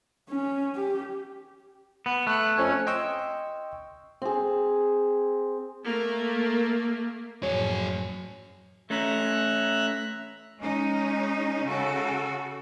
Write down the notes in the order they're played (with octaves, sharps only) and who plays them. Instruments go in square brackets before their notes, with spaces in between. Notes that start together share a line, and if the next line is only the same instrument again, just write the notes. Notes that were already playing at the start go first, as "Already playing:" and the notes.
[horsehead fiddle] C#4
G4
[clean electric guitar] B3
[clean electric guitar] A3 [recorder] F#6
[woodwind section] F2 C#4 C#5
[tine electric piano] D#5 G5 C6 C#6 E6
[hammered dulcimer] C4 G#4
[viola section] A3 A#3
[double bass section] F#2 A2 F3 [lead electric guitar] F#3 G#4 [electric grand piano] C#5
[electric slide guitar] A3 C#4 [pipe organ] E5 A#5 F#6
[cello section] G#3 C#4 D#4
C#3 F#4 A4